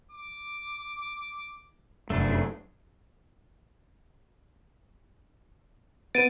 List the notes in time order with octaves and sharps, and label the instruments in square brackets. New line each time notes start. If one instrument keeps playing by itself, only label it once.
[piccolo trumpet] D6
[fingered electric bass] F1 F#2 [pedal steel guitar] A3 D4 [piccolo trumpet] G#4
[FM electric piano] B3 A6 [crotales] D7 D#7